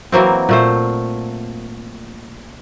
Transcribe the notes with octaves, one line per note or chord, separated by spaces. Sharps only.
E3 F#3 A#3 C4
A#2 A3 C5